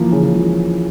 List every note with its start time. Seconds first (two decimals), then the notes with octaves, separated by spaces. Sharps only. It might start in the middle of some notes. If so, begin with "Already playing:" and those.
Already playing: E3 F3 A#3
0.12 C#3
0.35 F3